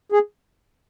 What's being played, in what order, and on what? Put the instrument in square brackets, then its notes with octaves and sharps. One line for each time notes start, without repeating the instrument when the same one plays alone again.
[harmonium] G#4